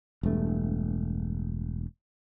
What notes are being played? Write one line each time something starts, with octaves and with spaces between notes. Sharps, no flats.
E1 G2 A3